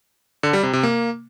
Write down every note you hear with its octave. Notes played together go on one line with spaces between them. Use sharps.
D3
G3
C3
C3
A#3